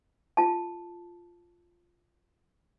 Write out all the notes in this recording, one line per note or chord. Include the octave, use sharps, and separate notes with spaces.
F4 A5